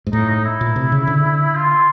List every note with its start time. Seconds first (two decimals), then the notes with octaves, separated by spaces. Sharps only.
0.07 G#2
0.13 A2 D#4
0.29 D#4
0.45 E4
0.61 A#2
0.76 C3
0.92 C#3
1.07 D3
1.55 F4
1.70 F4